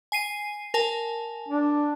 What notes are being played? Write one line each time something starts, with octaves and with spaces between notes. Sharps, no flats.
G#5 C7 D#7
A#4 G#5 A5
D4